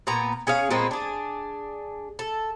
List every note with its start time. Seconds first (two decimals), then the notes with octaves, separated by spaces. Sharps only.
0.07 A#2 B3 A#5
0.47 C#4 G#4 C#5 F5
0.71 A#2 G#3 B3 C4
0.91 D4 G#4
2.19 A4